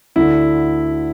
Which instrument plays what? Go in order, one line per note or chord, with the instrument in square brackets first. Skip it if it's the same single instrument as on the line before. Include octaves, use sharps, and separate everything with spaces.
[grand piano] D2 D3 E4